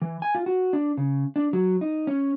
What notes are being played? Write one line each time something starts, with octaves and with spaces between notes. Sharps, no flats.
E3
G#5
F4
F#4
D4
C#3
D4
F#3
D#4
C#4